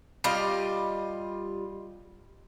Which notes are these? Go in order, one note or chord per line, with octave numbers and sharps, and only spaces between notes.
G3 F4 D#5